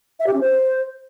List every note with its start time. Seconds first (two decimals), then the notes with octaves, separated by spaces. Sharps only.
0.19 E5
0.26 G4
0.34 C#4
0.41 C5